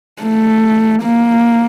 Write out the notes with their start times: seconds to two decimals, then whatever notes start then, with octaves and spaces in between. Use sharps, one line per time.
0.23 A3
1.03 A#3